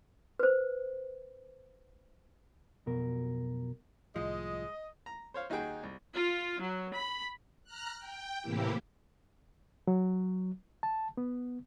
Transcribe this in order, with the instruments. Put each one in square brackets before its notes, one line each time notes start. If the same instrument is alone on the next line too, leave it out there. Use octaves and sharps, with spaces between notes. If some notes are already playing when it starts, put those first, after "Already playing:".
[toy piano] B4 C5
[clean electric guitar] B1 F2 B2 A#4
[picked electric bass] C2 A2 [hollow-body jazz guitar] F3 [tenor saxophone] G#3 [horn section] D#5
[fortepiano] A#5
C5 C#5 F5
D#2 D#4 F#4 G#4 G5
C2
[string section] F4
F#3
B5
[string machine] A#5 F6 F#6
G5
A2 C3 E3 A#3 E4 G4
[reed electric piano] F#3
A5
B3